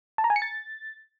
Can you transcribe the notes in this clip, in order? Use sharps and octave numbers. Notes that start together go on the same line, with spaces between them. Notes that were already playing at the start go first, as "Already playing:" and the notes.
A5
A#5
G#5
C#7
A6